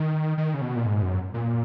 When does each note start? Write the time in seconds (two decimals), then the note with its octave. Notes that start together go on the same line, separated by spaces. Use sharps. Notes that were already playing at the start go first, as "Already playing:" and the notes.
Already playing: D#3
0.38 D#3
0.54 C#3
0.61 B2
0.76 A#2
0.86 G#2
1.02 F#2
1.34 A#2